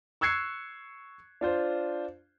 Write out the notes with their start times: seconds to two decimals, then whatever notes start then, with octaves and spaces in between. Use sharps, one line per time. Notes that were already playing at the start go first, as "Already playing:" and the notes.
0.21 C#6 E6 F#6 G#6 C7 C#7
1.41 D4 F4 C5